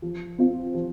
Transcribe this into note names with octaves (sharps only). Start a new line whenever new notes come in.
F3
C4 F4
F3